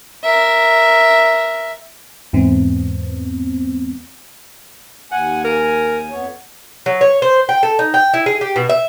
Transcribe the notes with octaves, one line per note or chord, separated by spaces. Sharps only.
A#4 E5
E2 G#2 B3 C4
D#2 F#5 G#5
A#4
F2 B3 C#5
F#3
C#5
C5
G5
A4
D#4
G5
E4
G#4
G4
B2
E5